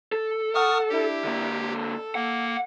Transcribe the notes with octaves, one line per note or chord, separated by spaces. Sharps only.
A4
F#5 C#6 D#6 F6
D4 E4 G4
D3 A#3
A4
A#3 F#5